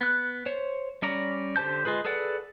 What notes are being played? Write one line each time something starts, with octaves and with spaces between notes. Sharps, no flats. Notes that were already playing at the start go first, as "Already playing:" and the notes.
B3 F#6
C5 C#5
G3 C#4 D5 A#5
D3 G4 C5 A5 G6
G#3 F4 G#4 B4
G#4 A4 B4 D5 F#5